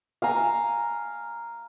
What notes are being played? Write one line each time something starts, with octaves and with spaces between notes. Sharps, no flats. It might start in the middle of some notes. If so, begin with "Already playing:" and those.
F5 G#5 A#5